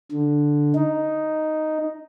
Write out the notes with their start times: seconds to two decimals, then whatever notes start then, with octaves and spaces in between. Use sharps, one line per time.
0.12 D3
0.75 D#4